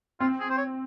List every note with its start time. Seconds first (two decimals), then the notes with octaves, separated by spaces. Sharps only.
0.20 C4 F4
0.40 G#4
0.50 C5
0.58 C#5